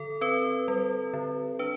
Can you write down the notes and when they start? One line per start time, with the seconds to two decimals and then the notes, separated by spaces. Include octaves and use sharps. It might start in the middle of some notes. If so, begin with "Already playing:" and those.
Already playing: D3 A4
0.21 C4 B4
0.68 G3
1.13 D3
1.59 D4 B4